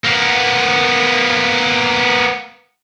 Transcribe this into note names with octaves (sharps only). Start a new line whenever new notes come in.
A#3 B3